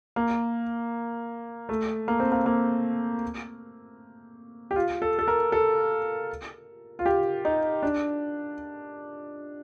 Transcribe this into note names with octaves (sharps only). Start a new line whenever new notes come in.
A#3
A3
A#3
C4
A#3
A#3
G4
F4
A4
A4
A#4
A4
F4
G4
D#4
D4